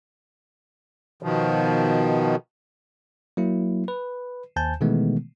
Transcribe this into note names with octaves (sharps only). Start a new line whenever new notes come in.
B2 D#3 F3
F#3 A#3 E4
B4
D#2 C5 G#5 A5 G6
B2 D#3 E3 G#3 A3 B3